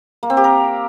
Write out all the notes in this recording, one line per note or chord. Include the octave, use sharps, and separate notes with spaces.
A#3
C4
G4
A#4